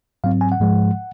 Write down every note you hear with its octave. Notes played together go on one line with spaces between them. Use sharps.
G#2 F#3 C4 F5
G#5
F#5
G#2 F3 G#3